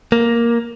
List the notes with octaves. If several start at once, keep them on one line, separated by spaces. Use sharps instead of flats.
A#3